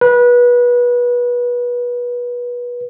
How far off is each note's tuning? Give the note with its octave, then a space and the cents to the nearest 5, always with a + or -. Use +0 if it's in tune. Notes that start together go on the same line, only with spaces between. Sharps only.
B4 -25